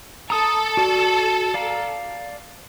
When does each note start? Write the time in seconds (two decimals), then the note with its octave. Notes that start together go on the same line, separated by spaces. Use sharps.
0.30 A4 A#5 D#6
0.77 F#4 D5
1.54 D5 F5 A#5